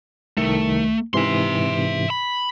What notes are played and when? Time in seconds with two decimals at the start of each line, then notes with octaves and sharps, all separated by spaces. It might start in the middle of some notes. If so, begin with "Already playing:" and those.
0.37 C2 D#3 A3 C#7
1.14 G#2 C3 E3 E5 C6
2.10 B5